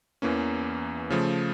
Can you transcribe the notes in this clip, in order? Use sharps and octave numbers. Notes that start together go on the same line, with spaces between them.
E2 E3 A#3 C#4
C#3 F3 A3